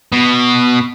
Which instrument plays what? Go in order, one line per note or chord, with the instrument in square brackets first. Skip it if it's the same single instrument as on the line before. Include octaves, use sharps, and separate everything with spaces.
[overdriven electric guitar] B2